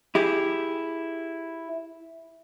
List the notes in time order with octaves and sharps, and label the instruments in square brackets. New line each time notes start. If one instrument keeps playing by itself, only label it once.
[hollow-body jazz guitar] E4 G4 G#4